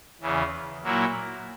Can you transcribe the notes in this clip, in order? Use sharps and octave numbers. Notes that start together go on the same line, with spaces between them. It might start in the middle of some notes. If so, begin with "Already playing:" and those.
E2 C#3 E3
A#2 F#3 A#3 E4